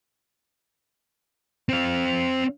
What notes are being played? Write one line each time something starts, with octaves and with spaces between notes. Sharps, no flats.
C4 F5